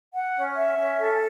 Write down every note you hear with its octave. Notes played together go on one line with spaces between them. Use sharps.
F#5
C#4
E5
C#4
A4